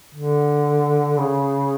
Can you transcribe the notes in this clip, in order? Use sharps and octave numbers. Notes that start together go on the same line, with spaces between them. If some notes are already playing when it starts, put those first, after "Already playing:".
D3
C#3